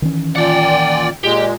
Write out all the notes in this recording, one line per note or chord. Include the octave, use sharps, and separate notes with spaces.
D#3 E3 C#4
A#2 D5 F#5 G5
A#2 G#3 G4